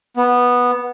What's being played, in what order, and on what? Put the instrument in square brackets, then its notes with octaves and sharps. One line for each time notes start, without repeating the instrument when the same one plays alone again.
[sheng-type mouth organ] B3